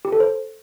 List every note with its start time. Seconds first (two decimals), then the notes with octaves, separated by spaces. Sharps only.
0.05 G4
0.12 A4
0.20 C5